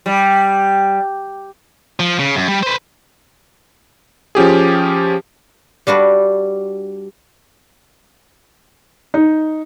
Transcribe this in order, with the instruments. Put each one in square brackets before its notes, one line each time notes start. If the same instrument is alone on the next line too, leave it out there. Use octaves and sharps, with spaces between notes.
[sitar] G3
[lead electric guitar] F3
C#3
F#2
G3
B4 C5
[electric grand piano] F3 C#4 G4 G#4
[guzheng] G3 D4 F#4 B4
[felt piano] D#4